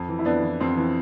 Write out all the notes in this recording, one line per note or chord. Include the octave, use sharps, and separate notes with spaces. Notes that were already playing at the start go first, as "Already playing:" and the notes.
Already playing: F2
E3
E4
F2 B3 D4
E3
F2 C4
E3